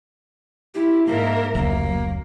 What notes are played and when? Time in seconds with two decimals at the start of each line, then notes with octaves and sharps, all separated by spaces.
0.74 E4 G4
1.06 G#2 A#3 A#4 E5
1.55 F1 C#2 F#3 A#3